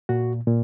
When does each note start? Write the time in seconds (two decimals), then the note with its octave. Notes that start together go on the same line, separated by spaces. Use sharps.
0.09 A#2 F#4
0.47 A#2